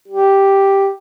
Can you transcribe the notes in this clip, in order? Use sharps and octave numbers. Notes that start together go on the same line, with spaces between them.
G4